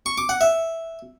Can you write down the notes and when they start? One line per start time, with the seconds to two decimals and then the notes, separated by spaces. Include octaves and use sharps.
0.06 C#6
0.18 D6
0.29 F#5
0.41 E5